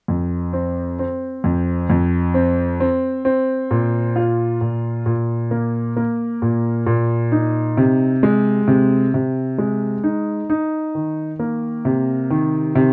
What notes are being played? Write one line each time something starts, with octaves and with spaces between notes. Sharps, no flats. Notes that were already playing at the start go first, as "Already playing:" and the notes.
F2
C4
C4
F2
F2
C4
C4
C4
A#2
F4
A#2
A#2
A#3
A#3
A#2
A#2
D#4
C3
G#3
C3
C3
G#3
D#4
D#4
D#3
A#3
C3
D#3
C3